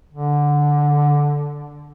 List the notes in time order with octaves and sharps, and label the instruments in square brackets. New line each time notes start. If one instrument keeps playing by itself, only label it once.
[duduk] D3